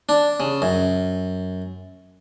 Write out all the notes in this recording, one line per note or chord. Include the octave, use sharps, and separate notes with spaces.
D4
C#3
F#2